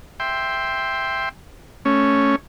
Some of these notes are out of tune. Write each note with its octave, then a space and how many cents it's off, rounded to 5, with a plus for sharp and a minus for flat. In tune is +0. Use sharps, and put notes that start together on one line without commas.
E5 +0 G5 +10 C6 +0
A3 +0 C#4 +0